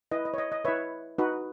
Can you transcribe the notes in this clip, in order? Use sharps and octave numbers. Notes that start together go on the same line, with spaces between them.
E4 B4 D#5
D#5
C#5
D#5
D#5
E4 B4 C#5 E5
D#4 F#4 B4